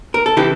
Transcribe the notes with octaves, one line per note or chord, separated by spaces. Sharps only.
A#4
A4
C#3 E3 E4 G4